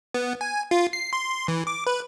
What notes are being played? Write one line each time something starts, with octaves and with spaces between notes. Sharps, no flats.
B3
G#5
F4
C7
C6
E3
D6
B4